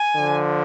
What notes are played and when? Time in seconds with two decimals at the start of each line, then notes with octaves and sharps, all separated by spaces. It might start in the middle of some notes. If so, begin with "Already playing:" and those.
Already playing: G#5
0.16 D3 F3